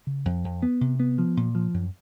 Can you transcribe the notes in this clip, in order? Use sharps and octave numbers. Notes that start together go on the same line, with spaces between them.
C#3
F2
F2
B3
C3
B3
F3
A#2
F3
F#2